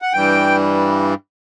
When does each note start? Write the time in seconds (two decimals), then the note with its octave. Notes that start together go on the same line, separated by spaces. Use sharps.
0.02 F#5
0.13 G2 E3 G3 G5